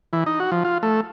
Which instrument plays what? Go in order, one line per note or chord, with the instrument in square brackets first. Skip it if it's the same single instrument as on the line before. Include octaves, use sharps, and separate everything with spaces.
[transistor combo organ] E3
D#4
F#4
F3
F4
A3